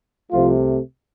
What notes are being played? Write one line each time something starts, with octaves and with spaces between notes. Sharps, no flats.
C2 C3 F3 A3 F4